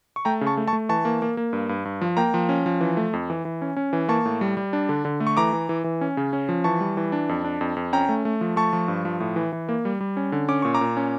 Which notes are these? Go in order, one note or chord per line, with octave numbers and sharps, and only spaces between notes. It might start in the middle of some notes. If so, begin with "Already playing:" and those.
C#6
A3 G5 A#5
C#3
A5 C#6
A3
A5 C#6
A3
E3 A5 C#6
A#3
A#3
A#3
G2
G2
G2
F3
A#3 G5 A#5
F3
C#4
F3
E3
A3
F2
E3
E3
C#4
C#4
E3
A#3 A5 C#6
A2
G3
G3
D4
D3
D3
A3
C#6
E3 A#5 D6
E3
E3
E3
C#4
C#3
C#4
F3
E3 A5 C#6
G3
E3
D4
F2
D4
F2
F2
C#4 G5 A#5
A3
A3
F3
A3 A5 C#6
F3
G2
F3
A2
E3
E3
A#3
G3
G3
C#4
D3
C#4 D6
A#2 C#6
A#5 D6
A#2
C#4